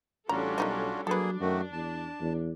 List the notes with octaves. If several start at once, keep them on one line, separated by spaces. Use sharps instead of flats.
A1 G3 C#4 D4 F4 F#4 A4 A#5
B1 A#3 D#4 D#5
F#3 A#3 D4 G#4 A4 B4
F#2 D#3 A3 F#4
E2 A5
E2